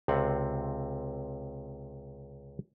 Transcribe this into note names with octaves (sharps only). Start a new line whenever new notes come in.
C#2 C3 C4 F#5